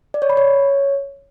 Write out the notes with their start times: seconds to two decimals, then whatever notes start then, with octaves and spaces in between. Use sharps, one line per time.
0.14 D5
0.22 C#5
0.30 B5
0.37 C#5